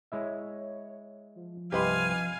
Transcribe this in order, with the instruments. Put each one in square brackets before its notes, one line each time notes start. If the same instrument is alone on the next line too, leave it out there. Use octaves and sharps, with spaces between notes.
[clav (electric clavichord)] G#3 E4 E5 [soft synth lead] C#5
[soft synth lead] F3
[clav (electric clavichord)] C2 G2 D#5 [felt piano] G4 B4 C6 [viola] F5 G#5